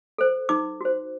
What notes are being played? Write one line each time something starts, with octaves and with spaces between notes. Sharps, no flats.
A4 C5
D#4 D6
F#4 C5